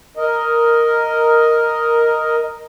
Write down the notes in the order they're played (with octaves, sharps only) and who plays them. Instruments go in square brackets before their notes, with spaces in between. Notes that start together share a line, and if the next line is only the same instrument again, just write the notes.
[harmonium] A#4 D#5